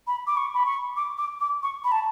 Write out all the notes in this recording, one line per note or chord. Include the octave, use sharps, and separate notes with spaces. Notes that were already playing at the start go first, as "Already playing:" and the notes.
B5
D6
C#6
B5
C#6
D6
D6
D6
C#6
B5
A5